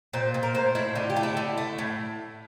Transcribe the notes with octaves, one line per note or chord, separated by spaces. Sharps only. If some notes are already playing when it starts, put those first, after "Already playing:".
A#2 C5
A#2
A#4
A2 C5
A2 E4
D3 F4
G4
A3
E4
D3
A3
A2